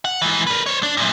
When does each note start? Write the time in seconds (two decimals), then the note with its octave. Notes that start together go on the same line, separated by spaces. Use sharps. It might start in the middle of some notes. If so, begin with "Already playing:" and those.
0.05 F#5
0.22 G#2 E3
0.47 A#4 B4
0.66 C5 C#5
0.83 D4
0.97 F#2 A#2